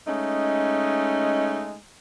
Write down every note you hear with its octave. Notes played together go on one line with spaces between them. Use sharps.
G#3 A3 C#4 D#4